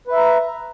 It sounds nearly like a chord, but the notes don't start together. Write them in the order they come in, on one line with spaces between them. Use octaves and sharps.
B4 E5 A#5